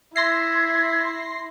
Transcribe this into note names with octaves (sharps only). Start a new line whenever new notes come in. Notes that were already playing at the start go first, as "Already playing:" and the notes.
E4 E5 C6 G#6 A#6 C7